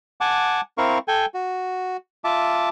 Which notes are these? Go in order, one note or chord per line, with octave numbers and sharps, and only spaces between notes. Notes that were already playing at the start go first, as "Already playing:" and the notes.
F#5 G#5 A5 D6
C4 E4 A#4 F5 C#6
A4 G5 G#5
F#4
F4 E5 A5 D6